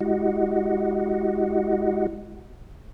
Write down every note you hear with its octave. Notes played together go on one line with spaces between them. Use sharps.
G#3 E4 F#4 G4 D#5 F#5